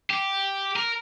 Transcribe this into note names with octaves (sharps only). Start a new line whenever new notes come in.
G4
A#4